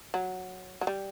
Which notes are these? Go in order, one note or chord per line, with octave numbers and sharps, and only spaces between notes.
F#3
F#3
G3